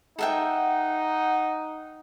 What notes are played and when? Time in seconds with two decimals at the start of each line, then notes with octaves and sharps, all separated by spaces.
0.19 D#4 A4 E5 F#5 G5